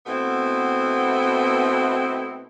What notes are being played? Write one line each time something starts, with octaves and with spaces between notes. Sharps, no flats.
B2 A3 B3 C4 E4